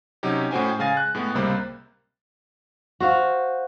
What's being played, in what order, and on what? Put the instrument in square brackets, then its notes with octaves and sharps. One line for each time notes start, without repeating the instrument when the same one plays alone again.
[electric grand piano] C3 F#3 C#4 D#4 G4
A2 C#4 F#4 C5 G5 G#5
C#3 G#3 F5 G#5 A6 A#6
F#6
A2 G#3 B3
C#2 C3 G3 A#3 C5 B5
[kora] F#4 C5 F5